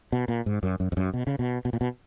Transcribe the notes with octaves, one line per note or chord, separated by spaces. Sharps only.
B2
A#2
G#2
F#2
F#2
F2
F#2
B2
C#3
B2
B2
A#2
B2